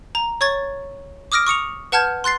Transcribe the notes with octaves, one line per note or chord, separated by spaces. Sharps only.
A#5
C#5 C#6 G#6 A6
D6 D#6 F6 A#6 D7
C#6 D#6 C#7 F7
B4 F#5 A5 F6 G6 G#6
C6 F#6 A6 C7